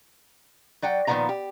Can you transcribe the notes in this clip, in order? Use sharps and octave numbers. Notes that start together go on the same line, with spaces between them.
F#3 D5 F#5 G5
A#2 D#3 F3 B3 D5 A#5
G4